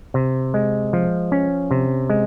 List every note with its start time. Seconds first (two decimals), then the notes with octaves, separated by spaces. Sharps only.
0.14 C3
0.54 G#3
0.93 F3
1.32 C#4
1.71 C3
2.10 G#3